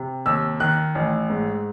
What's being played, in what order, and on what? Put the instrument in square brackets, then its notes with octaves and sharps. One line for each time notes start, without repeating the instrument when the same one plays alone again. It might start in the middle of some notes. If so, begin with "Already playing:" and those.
Already playing: [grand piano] C3
D#2 E6
D#3 F#6
A1
G#2